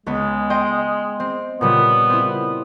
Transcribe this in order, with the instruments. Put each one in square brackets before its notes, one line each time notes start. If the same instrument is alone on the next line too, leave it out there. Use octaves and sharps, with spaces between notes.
[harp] C#2 B3 [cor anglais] G#3
[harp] D#5 G5 C6
C4
[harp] A#2 C#3 G3 [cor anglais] B3
[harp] C4 E4